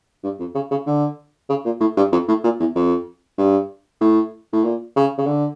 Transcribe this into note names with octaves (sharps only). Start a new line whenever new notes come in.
G2
F2
C#3
C#3
D3
C#3
A#2
A2
G2
F2
A2
A#2
E2
F2
G2
A2
A2
A#2
C#3
C#3
D3